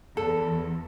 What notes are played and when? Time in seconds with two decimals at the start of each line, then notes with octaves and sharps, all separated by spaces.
0.17 E2 A4